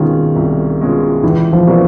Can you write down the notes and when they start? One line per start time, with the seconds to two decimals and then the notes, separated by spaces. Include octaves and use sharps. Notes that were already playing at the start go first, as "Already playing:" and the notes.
Already playing: C2 B2 D#3 G#3 C#4 F4
0.35 C2
0.80 B2 G#3 C#4 F4
1.23 C#2 E3
1.53 F3
1.67 B2 F#3 A#3 D4